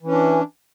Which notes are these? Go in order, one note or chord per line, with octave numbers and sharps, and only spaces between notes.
E3 C#4 D4